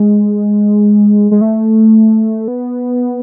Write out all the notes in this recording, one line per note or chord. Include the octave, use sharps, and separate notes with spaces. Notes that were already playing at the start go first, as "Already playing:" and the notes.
Already playing: G#3
G#3
A3
B3